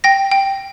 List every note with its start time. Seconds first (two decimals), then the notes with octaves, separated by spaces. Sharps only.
0.04 G5 A#6
0.31 G5